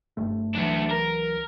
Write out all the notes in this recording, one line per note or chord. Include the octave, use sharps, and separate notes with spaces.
F#1 G2 A3
C#2 E3 F#3 A3 D4
A#4